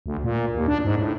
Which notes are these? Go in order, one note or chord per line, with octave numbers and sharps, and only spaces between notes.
D2
A#2
D#2
D4
G#2
A2